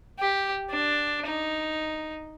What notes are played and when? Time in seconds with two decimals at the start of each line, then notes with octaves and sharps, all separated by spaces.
0.20 G4
0.71 D4
1.26 D#4